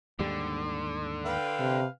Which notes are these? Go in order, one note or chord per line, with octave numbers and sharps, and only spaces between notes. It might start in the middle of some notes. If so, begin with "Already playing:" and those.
D#2 G#2 D3 G3
B4 F5 G5
C3